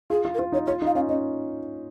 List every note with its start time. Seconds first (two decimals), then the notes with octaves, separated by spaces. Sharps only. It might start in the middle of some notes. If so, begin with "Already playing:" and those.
0.10 F4 G#4
0.25 F4
0.34 A#4
0.39 F4 C5
0.52 D#4 C#5
0.67 F4 C#5
0.82 D#4 F5
0.95 C#4 F5
1.09 C#4 D#5